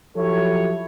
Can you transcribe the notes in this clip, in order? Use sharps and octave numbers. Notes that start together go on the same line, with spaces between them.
F3 F#3 E4 G4 A4 C#5